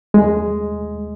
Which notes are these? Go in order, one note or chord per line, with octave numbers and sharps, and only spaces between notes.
D#2 G#3